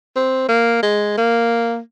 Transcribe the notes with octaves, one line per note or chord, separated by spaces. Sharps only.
C4
A#3
G#3
A#3